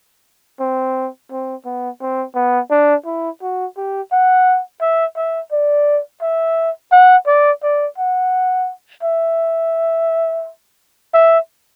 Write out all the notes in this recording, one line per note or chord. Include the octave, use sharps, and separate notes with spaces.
C4
C4
B3
C4
B3
D4
E4
F#4
G4
F#5
E5
E5
D5
E5
F#5
D5
D5
F#5
E5
E5